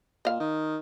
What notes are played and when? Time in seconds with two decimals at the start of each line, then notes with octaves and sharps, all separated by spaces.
0.25 A#2 D#5 F5
0.40 D#3